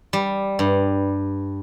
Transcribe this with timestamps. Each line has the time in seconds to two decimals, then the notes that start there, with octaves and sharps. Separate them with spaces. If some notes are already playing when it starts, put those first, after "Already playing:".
0.13 G3
0.59 G2